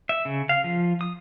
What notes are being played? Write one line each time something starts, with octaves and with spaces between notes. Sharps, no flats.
E5
C#3
F5
F3
D#6